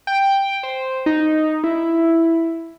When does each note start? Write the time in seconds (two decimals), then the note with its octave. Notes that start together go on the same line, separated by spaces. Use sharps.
0.07 G5
0.63 C5
1.06 D#4
1.64 E4